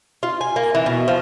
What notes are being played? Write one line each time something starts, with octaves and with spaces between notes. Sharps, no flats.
F4
G#5
A#3
E3
B2
F3